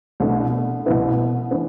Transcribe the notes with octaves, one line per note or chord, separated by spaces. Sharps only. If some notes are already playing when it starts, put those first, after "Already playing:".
C2 B2 A3 D4
C2 B2 B3 E4
E3 B3 D4